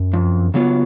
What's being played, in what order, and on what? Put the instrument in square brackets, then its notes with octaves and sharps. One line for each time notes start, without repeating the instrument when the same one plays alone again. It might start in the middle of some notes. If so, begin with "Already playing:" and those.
Already playing: [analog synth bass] F#2
[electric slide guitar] F2
C#3 F#3 B3 F4